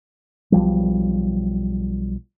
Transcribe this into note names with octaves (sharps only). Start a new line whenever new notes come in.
B1 F3 G3